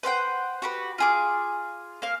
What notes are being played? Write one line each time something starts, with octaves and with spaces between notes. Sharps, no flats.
B4 C5 F#5 G5
F#4 G4 B4
F4 G#4 D6
A#3 F5